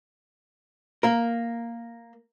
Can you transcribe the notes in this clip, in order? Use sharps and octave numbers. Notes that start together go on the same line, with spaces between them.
A#3 A#4